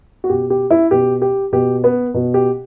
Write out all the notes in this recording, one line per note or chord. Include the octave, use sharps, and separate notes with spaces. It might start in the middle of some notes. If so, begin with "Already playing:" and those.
F#4
B2 G4
G4
E4
B2 G4
G4
B2 G4
B3
B2
G4